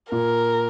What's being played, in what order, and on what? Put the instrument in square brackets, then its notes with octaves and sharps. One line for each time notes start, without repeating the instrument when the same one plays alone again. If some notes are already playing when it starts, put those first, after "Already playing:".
[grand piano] A#2 [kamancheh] A#4